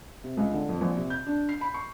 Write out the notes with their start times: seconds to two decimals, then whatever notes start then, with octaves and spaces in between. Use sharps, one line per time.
0.24 C3
0.37 C#2
0.52 D3
0.69 F2
0.81 A#1
0.97 C3
1.10 G6
1.27 D4
1.49 C7
1.61 B5
1.74 C#6